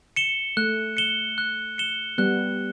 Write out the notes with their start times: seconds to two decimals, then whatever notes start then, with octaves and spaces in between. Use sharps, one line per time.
0.16 C#7 E7 G7
0.57 A3 F#6
0.97 C#7 E7 G7
1.38 F#6
1.78 C#7 E7 G7
2.18 G3 B3 F#6